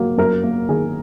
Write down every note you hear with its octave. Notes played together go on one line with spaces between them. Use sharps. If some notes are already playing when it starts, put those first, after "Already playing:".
Already playing: F#3 A#3
F#2 A#4
A#3
D#3 G#4